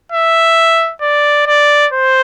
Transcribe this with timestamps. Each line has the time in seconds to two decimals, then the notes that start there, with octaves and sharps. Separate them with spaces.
0.12 E5
1.02 D5
1.47 D5
1.93 C5